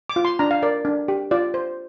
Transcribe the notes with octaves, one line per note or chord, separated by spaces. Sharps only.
D6
F4
C6
D4 A#5
F5
A#4 D5
D4
G4
F4 D5
C5